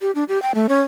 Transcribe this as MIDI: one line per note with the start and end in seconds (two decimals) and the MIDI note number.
0.01 0.11 67
0.15 0.24 62
0.29 0.41 67
0.42 0.52 79
0.55 0.66 57
0.69 0.82 61